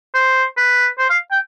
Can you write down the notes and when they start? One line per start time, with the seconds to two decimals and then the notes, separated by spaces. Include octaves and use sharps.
0.14 C5
0.57 B4
0.99 C5
1.10 F5
1.31 G5